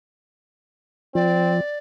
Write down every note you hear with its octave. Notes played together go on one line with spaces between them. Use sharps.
F3 C4 D5